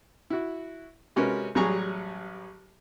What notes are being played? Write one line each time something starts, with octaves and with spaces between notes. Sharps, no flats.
E4 F#4
C3 G#3 C#4 F#4 A#4 B4
A1 F#3 G3 G#4 A#5 C#6